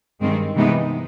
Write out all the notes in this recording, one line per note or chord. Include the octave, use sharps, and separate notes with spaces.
G2 D#3 G#3 C4
C3 E3 G#3 B3 D#4